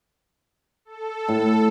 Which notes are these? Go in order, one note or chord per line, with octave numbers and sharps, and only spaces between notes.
A4
A2